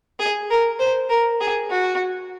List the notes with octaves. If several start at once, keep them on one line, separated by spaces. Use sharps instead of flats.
G#4
A#4
C5
A#4
G#4
F#4